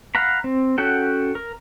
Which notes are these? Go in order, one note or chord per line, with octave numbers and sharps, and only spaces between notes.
F5 F#5 A#5 B5
C4
C#4 F#4 A4 F#5 G5
A#4